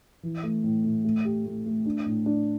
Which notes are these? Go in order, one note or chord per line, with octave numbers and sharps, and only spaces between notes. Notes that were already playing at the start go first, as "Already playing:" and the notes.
E3
A3
A2
A2
A3
G4
A3
A3
D4
A2
D4